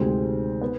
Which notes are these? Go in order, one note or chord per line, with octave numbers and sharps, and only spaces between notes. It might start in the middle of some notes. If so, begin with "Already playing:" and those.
Already playing: D2 C3 D#3 G#3 C4
B3